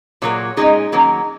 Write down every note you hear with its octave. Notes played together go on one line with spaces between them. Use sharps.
A#2 F#3 A#3 G#4 C#5
A#2 G#3 C#4 D#4 G#4
D#3 F#3 A#3 C#4